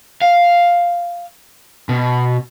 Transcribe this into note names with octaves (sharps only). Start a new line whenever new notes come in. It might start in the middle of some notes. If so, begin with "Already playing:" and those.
F5
B2